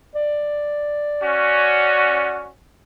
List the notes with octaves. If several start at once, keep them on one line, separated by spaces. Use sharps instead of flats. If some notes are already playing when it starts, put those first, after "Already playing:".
D5
C#4 F#4